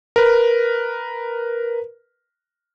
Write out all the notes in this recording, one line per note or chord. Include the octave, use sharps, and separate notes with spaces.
A#4 B4